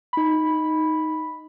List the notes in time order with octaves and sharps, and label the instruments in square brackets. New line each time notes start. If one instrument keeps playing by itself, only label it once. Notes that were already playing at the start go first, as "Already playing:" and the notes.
[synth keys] D#4 B5